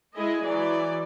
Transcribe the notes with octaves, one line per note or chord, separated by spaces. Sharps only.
G#3 E4 G#4 D#5
E3 F#3 D5